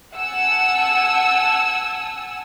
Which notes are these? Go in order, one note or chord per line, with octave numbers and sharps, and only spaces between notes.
F#5 G#5 A5 E6